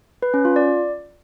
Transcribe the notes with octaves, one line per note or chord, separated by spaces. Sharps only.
B4
C#4
F4
D5